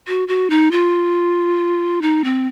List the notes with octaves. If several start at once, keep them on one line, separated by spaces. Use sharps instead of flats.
F#4
F#4
D#4
F4
D#4
C4